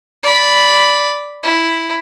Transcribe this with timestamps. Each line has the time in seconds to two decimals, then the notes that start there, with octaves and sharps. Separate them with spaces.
0.24 D5 B5
1.44 E4